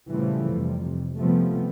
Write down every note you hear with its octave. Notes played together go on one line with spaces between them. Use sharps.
A#2 C#3 E3 F3 G3 A3
F2 C3 G3
C3 F3 G3 A3 B3